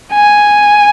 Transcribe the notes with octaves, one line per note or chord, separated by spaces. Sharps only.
G#5